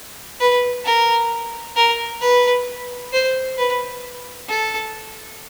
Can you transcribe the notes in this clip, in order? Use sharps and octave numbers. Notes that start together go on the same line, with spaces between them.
B4
A#4
A#4
B4
C5
B4
A4